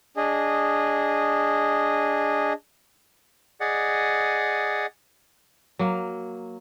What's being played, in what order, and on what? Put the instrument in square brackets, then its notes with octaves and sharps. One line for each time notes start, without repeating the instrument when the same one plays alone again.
[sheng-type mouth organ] D4 G#4 D#5
[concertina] G#4 D5 D#5 F#5
[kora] F#3 A#3